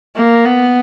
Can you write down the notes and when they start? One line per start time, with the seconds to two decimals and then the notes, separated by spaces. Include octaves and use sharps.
0.16 A#3
0.45 B3